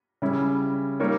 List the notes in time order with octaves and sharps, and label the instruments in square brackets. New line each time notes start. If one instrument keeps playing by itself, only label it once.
[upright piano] C#3 G3 C#4 E4
G3 A#3 D#4 A#4 C#5